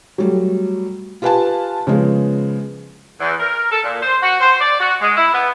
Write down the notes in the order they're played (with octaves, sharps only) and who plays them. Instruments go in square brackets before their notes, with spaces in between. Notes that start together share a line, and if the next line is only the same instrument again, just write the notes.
[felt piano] F#3 G3 A3
F4 G4 B4 F5 G#5 A5
C#3 F3 G#3 B3
[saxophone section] E2
A#4
A4
A#2
C5
F#4
C5
D5
F#4
G#3
E4
B3